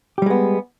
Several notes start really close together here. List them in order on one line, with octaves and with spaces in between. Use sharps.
G4 G3 G#3 B3